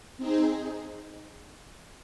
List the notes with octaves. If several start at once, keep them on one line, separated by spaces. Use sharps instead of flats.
C4 D#4 G#4